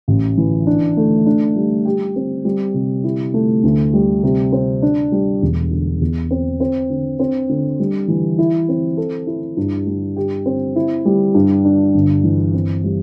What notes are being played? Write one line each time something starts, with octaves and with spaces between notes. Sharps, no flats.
A1
E3
D4
A3
D4
G3
G4
C4
G3
C3
E4
A3
D2
G3
C3
C4
D4
G3
E1
D3
E2
C4
C4
D3
C4
D3
G3
E3
E4
C4
A4
E4
G2
G3
G4
C4
E4
G3
G2
D4
G1
E3
C4
G3